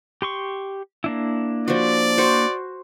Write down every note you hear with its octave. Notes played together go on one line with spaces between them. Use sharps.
G4 C6 C#6
A#3 D4 E4
F3 F#4 D5
F#4 C5 C#6